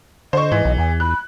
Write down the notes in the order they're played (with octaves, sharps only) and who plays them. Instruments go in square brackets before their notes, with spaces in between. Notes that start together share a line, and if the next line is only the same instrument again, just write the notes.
[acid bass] D3 [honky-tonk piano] C5 C#6 [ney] D#5
[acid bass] G#2 [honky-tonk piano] E3
[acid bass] B1
[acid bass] E2 [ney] G#5
[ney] B5 [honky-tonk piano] F#6